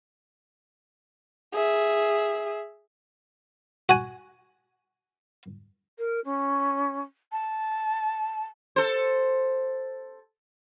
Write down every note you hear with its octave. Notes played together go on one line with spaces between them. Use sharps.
G#4 E5
F#4 G#5
A#4
C#4
A5
A4 C5